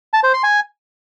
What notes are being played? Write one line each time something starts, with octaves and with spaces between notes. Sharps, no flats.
A5
C5
C6
G#5